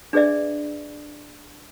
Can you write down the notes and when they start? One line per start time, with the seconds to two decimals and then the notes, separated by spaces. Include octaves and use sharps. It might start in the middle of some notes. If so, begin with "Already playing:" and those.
0.13 D4 G#4 B4 D5 E5